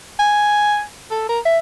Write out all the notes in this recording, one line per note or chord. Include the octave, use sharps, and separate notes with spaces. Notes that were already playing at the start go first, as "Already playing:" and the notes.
G#5
A4
A#4
E5